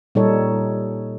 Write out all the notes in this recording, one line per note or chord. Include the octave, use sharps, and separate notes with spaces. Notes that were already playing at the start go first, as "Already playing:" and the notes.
A#2 G3 D#4 A4 C#5